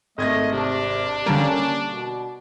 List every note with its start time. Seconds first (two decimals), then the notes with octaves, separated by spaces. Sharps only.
0.18 G#1 A3 D#5 G#6 A#6
0.52 C3 D4
1.26 D3 G3 A#3 C#4 D7
1.87 B2